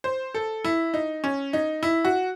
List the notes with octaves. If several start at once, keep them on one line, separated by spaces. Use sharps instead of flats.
C5
A4
E4
D#4
C#4
D#4
E4
F#4